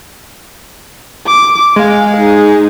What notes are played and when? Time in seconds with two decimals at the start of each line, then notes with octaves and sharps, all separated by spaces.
1.27 D6
1.76 G#3 F5
2.17 D#4 G#4